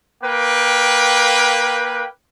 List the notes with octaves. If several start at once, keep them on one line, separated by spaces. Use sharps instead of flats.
A#3 B4 G5